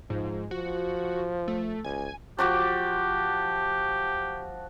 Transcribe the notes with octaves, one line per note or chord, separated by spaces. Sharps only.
G#2 F3
F3 F#4
A3
C#2 G#5
F3 F#4 G4 D6